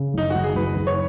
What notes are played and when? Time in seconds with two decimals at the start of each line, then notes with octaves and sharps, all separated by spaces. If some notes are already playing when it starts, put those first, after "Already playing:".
Already playing: C#3
0.14 F#1 D#4
0.30 F#1 F#4
0.44 G#4
0.55 F#1 B4
0.76 F#1
0.87 C#5